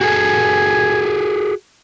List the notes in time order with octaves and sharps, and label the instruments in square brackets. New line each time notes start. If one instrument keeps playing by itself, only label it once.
[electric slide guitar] F#4 G#4 A4 [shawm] G#5